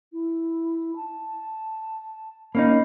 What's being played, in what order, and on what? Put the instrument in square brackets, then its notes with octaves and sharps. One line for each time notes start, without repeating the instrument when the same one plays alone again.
[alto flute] E4
A5
[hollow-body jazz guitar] A#3 C#4 D#4 [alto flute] B5